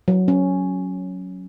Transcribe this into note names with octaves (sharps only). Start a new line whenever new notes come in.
F#3
C#4